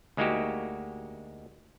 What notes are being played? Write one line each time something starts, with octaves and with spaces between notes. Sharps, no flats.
D2 G#3 A#3 D#4 F#4 G4